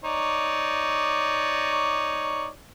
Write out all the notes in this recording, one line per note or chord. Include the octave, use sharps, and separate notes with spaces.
D#4 C#5 D5